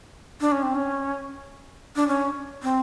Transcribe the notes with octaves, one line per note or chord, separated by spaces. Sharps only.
D4
C#4
C4
C#4
D4
C#4
C4